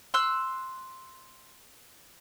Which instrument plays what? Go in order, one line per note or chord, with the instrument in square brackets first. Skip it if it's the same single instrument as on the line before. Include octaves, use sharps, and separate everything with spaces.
[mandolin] C6 E6 F#6